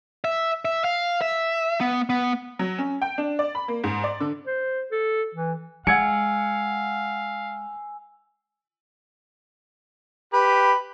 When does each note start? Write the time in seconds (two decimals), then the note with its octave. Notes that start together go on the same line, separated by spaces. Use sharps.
0.24 E5
0.65 E5
0.84 F5
1.21 E5
1.80 B3
2.10 B3
2.59 F#3
2.78 C#4
3.02 G5
3.18 D4
3.39 D5
3.55 B5
3.68 A#3
3.84 G#2
4.04 D5
4.20 D3
4.47 C5
4.92 A4
5.35 E3
5.87 G#3 F5 F#5 G#5 E6 G#6 C#7
10.34 G4 B4